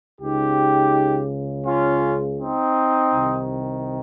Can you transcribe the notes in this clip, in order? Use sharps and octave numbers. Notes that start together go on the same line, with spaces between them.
C#2 C#3 D#4 G4
C#4 F4
C4 D#4
C2 C3 D#3